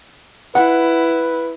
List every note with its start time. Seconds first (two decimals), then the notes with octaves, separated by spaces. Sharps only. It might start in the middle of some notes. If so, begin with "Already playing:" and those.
0.55 E4 B4 F#5